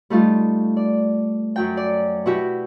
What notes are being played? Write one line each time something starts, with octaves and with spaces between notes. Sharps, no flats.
G3 A3 D#4 F4
D5
F#2 F#3 G5
D5
B2 E4 F#4 G4